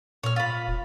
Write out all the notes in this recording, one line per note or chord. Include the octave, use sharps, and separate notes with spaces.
A#2 C#5 F6
F4 B5
E1